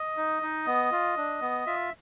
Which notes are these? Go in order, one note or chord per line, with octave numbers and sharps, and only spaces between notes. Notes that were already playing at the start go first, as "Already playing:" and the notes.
Already playing: D#5
D#4
D#4
B3
F4
D4
B3
F4 E5